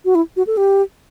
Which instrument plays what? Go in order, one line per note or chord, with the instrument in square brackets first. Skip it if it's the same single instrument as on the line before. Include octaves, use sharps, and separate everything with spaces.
[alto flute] F#4
E4
F#4
A4
G4